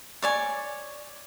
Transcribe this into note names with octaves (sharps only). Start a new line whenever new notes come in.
C#5 D5 G#5